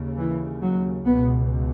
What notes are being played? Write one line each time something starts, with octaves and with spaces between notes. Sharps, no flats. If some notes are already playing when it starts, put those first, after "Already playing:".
Already playing: D#2 C#3
E3
F#3
C#2 B2 B3